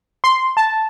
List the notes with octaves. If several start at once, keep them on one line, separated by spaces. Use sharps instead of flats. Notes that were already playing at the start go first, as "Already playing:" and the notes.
C6
A5